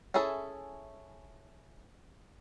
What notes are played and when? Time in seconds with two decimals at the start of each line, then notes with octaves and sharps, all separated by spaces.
0.14 C#4 E4 G#4 A4 E5